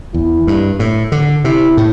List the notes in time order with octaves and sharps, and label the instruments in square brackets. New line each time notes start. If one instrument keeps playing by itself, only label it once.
[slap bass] E2 [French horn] E4
[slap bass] G2
A2
D3
[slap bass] C3 [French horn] E4
[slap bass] A2